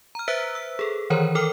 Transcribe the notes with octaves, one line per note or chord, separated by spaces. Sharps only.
A#5 F6
B4 C5 E5 E6 F#6 B6
E6
G#4 A4
D#3 E3 A#4 C5 C#5 A#5
A4 A#4 G5 D6 F6